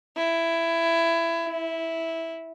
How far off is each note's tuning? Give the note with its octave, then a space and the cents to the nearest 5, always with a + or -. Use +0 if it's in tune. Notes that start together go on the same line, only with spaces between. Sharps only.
E4 +15
E4 -10